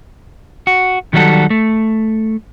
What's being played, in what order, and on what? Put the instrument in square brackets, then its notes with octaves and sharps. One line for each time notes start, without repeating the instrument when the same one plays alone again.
[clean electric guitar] F#4
D#3 F#3 G3 D4 F#4 A4
A3